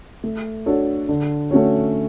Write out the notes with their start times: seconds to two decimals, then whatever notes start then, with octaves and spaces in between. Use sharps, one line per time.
0.24 A3
0.66 D4 F#4 A4 C#5
1.09 D3
1.51 A3 C#4 F#4 C#5